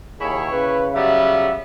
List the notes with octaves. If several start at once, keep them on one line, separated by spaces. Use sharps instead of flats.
D#2 E4 G#4 C#5
C#3 B4
F#3 G3 B3 E5